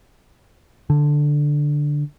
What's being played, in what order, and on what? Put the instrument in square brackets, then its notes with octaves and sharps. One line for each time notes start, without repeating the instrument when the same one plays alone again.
[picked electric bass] D3